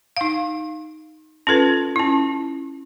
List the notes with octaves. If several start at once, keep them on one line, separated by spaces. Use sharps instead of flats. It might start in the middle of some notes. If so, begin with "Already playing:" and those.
D#4 F5
C#4 F4 A4 B4
C#4 E4